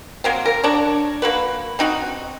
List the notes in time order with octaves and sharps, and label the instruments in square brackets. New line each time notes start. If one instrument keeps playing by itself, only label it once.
[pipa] F#3 A#3 C4
A#4
D4 C#5
A#3 F#4 B4
C4 D#4 F#4